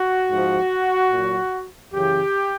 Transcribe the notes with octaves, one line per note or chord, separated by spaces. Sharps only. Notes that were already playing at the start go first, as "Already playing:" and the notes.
Already playing: F#4
G#2 F3
A#2 F#3
F#2 C#3 E3 G4